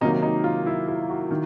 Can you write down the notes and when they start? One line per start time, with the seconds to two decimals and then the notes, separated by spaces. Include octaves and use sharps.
0.01 C3 D#3 F#3 A#3 D#4
0.22 D#4
0.44 F4
0.66 E4
0.88 E4
1.09 F#4
1.31 D#3